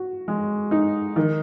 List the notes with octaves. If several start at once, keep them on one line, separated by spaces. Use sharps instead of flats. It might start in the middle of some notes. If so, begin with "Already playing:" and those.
Already playing: F#4
G#3
D#4
D#3